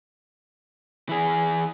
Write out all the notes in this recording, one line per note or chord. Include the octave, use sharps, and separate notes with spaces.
E3 G#4